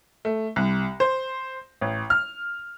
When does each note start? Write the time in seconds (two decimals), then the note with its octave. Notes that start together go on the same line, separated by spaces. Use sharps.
0.25 A3
0.56 C2
1.00 C5
1.81 A1
2.10 F6